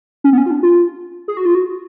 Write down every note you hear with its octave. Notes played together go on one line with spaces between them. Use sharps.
C#4
B3
C#4
F4
D4
F4
G#4
F#4
F4
F#4